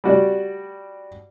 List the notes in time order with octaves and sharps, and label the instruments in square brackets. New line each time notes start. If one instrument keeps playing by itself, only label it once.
[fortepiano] G3 F#4 D5